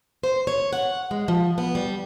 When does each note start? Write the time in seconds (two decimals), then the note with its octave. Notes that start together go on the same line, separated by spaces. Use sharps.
0.23 C5
0.47 C#5
0.73 F#5
1.11 G#3
1.28 F3
1.58 B3
1.75 G3